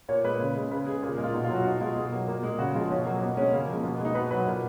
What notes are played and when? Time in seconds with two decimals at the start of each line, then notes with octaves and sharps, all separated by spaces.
0.09 A#2 C#5
0.24 G#3 B4
0.40 C#3
0.56 G#3
0.71 C#3 B4
0.87 G#3 G#4
1.02 A#2 G#4
1.13 A#4
1.18 G#3
1.24 F4
1.34 B2 D#4
1.44 F4
1.50 F#3 F#4
1.65 B2 D#4
1.81 G#3 F4
1.96 B2 G#4
2.12 F#3 A#3
2.28 A#2 A#3
2.43 G#3 G#4
2.59 C#3 F#4
2.74 F3 G#3 F4
2.90 B2 C#4
3.05 F#3 A#3
3.21 B2 B3
3.37 G#3 C#4
3.52 C#3 A#3
3.68 F3 G#3
3.84 B2 A#3
3.94 B3
3.99 G#3
4.05 D#4
4.15 B2 B4
4.31 F#3 B4
4.46 A#2 A#4